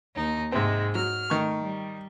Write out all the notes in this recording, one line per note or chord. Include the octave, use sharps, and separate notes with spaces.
D#2 D#4
G#2 C3 G#3 C4
F#3 F6
D#3 A3 C#6
G3